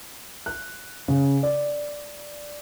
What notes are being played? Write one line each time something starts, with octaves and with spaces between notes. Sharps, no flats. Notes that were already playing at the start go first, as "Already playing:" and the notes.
F#6
C#3
D5